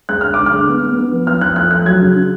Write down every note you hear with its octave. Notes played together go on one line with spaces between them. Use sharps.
G#3 F#6
D3 F6
D3 D6
F6
G#3
B3
B3
B3
F3
F3 F6
F3 F#6
A3 F#6
F3 F#6
F#3 G#6
C#3
C#3